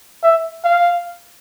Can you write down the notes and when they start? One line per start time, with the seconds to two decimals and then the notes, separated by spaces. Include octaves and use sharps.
0.24 E5
0.65 F5